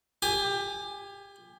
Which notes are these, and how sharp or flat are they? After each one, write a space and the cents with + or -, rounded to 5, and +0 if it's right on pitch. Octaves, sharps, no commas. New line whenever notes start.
G4 +25 G#5 +0